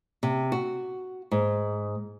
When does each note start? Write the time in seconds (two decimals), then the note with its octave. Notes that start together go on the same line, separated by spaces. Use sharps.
0.23 C3
0.52 F#4
1.31 G#2